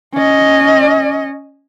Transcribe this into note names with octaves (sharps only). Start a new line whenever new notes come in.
C#4 D#5